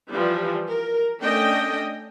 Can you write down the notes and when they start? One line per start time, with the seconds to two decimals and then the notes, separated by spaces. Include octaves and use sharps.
0.10 E3 F3 G3
0.71 A#4
1.23 A3 C#4 D4 D#5 G5